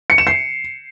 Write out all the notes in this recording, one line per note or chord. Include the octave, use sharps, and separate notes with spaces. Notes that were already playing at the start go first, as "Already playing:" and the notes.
C#7
E7
C7